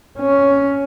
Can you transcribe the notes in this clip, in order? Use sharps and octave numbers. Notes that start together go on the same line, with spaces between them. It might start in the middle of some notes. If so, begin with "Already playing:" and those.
C#4